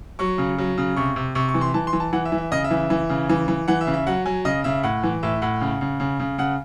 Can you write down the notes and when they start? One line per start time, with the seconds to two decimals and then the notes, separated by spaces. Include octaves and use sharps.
0.19 F#3 C#6
0.38 C#3
0.58 F#3
0.78 C#3
0.96 C3 C#6
1.16 C3
1.35 C3 C#6
1.49 C#6
1.54 E3
1.61 C6
1.74 E3 A5
1.87 C6
1.93 E3
2.00 A5
2.13 E3 F#5
2.25 E5
2.32 E3
2.38 E5
2.52 C#3 D#5
2.64 E5
2.70 E3
2.77 E5
2.90 E3
3.09 C#3
3.29 E3
3.48 E3
3.68 E3 F#5
3.81 E5
3.87 C#3
3.94 E5
4.06 F#3 F#5
4.25 F#3 G#5
4.45 C#3 D#5
4.64 C#3 E5
4.83 A2 F#5
5.03 E3
5.23 A2 E5
5.42 A2 F#5
5.61 C#3
5.81 C#3
6.00 C#3
6.20 C#3
6.38 C#3 F#5